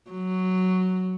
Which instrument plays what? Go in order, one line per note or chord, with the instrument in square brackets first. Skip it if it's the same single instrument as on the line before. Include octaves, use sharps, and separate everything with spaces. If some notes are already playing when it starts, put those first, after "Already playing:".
[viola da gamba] F#3